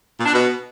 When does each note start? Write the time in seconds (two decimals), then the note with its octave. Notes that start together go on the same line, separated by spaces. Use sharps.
0.18 A#2
0.26 D4
0.33 B2